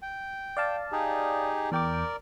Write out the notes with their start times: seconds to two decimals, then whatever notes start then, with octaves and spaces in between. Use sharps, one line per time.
0.02 G5
0.57 D5 F5 A5
0.92 D#4 G4 G#4
1.72 E2 A#4 D5 G5 D6